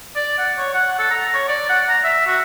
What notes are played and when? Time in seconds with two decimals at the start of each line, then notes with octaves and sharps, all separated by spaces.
0.16 D5
0.38 F#5
0.58 C#5
0.74 F#5
0.99 A4
1.10 A#5
1.34 C#5
1.48 D5
1.69 F#5
1.89 A#5
2.04 E5
2.27 F#4